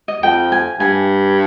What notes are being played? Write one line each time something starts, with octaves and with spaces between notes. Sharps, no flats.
D#5
F2 G5
G#5
G2 G#5